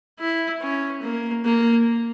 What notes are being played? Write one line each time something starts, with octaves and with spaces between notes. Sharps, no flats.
E4
C#4
A#3
A#3